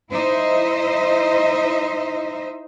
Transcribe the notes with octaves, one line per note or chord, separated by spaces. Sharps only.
D#4 E4 C5 D#5 E5